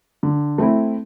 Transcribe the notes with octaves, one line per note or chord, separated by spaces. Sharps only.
D3
A3 C4 E4